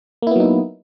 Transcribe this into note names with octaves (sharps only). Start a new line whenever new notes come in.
F#3 A#3 B3 D#4 E4